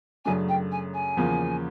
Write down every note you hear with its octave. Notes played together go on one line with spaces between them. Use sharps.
F#2 C#3 F#3 A3 D4 G#5
G5
G#5
G#5
E2 C#3 F3 A#3